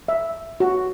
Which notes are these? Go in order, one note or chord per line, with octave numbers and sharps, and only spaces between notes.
E5
F#4